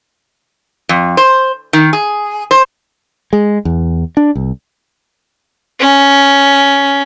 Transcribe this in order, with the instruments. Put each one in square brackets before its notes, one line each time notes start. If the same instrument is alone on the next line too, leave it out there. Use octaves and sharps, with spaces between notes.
[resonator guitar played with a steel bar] F2
C5
D#3
G#4
C5
[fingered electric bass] G#3
E2
D4
C2
[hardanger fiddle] C#4